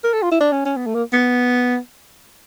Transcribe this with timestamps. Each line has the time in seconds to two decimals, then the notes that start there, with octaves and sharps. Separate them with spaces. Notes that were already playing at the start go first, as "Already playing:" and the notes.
0.04 A#4
0.13 A4
0.23 F4
0.32 E4
0.40 D4
0.52 C#4
0.65 C#4
0.77 B3
0.86 A3
0.95 A#3
1.13 B3